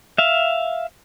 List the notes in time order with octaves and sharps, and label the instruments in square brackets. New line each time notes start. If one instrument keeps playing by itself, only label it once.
[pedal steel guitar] E5 F5